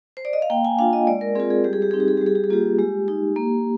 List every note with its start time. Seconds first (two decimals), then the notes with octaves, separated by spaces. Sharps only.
0.17 C5
0.25 D5
0.33 D#5
0.42 F5
0.50 A#3 G5
0.65 G#5
0.79 D4 F4 F5
0.93 D#5
1.07 G#3 D5
1.21 A#4
1.35 C4 F4 G#4
1.50 G#4
1.64 G3 G4
1.73 G#4
1.82 G4
1.91 C4 D#4 G#4
2.00 G4
2.08 G#4
2.17 G4
2.21 G3
2.26 G#4
2.35 G4
2.44 G#4
2.50 A#3 F4 G4
2.79 G#3 G4
3.08 D#4
3.36 A#3